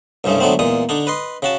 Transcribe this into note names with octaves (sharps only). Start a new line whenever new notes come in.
C2 G2 C#3 G#3 A3
D3 F#3 G#3 A3 B3 C4
E2 A#2 G#3 D#6
D3 D4 D#4
B4 D#5 C6
C#3 F#4 A5